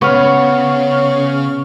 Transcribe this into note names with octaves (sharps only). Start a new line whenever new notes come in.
C#3 B3 C#5 C#6 F6